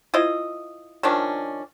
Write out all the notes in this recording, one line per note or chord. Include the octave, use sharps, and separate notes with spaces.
E4 F4 C5 D#5
D#3 F3 C#4 D4